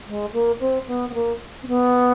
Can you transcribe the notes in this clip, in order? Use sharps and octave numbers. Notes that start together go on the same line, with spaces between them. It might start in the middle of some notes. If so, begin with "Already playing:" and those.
G#3
A#3
C4
B3
B3
A#3
C4
B3